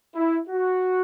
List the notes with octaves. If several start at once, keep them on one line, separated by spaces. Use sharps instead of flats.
E4
F#4